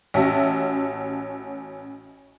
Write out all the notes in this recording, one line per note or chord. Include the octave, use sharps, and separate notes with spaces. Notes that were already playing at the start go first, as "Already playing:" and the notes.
A1 C#4 F#4 E5 A5 A#6